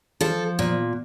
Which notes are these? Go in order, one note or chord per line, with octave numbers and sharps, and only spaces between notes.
F3 A4
A#2